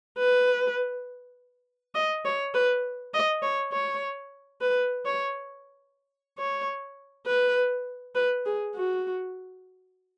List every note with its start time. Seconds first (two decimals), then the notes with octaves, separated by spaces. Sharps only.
0.18 B4
1.95 D#5
2.25 C#5
2.55 B4
3.14 D#5
3.43 C#5
3.73 C#5
4.61 B4
5.06 C#5
6.39 C#5
7.27 B4
8.16 B4
8.46 G#4
8.75 F#4